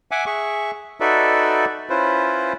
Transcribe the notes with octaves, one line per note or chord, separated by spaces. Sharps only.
E5 F#5 G#5 D6
G#4 E5 C#6
D#4 F#4 A4 B4 D5 E5
C#4 E4 F4 B4 C5